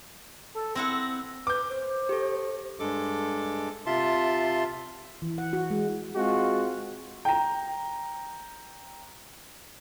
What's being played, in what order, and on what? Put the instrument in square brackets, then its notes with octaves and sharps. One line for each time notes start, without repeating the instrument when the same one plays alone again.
[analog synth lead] A4
[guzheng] C4 E4 F#5 [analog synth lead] A#6
[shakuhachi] B4 [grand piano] D6 G6
[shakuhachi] C5
[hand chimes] G4 A4
[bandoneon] G2 G#3 A4 D6
C3 F4 E5 A5 C6
[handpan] E3
F#5
F#4
G#3
[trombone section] G#3 C4 F4 F#4
[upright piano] G5 A#5